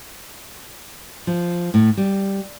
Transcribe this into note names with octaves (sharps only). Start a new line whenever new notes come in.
F3
A2
G3